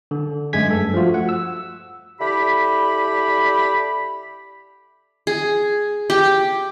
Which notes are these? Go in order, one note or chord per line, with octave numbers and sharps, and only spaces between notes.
D3
F#2 G#3 A3 G#5 G#6 B6
G2 A4
F3 A3 F4 F#4
F#5
E6
D3 E4 G4 B5
G#4
G4